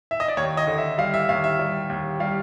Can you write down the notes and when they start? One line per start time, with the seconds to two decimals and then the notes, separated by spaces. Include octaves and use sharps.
0.11 E5
0.20 D#5
0.28 D5
0.37 D#2 C#5
0.57 D#5
0.67 D3
0.78 E5
0.98 G3 F5
1.14 E5
1.29 D#2 F5
1.44 E5
1.59 G3
1.89 D#2
2.20 G3 F5